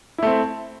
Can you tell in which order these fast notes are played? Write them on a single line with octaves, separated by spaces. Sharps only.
E4 A3 C4